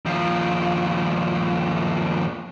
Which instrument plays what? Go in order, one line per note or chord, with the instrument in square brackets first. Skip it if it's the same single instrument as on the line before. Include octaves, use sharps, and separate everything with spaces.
[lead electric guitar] D#2 F3